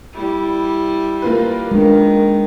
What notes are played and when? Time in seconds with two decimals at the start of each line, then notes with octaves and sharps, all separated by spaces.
0.14 G3 E4
1.22 A#3 F4 B4
1.71 D#3 G#3 D4